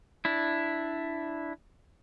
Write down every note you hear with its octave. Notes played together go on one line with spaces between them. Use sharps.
D4 E4